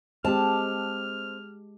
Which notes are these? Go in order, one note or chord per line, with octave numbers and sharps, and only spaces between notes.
G#3 C4 G4 A5 F6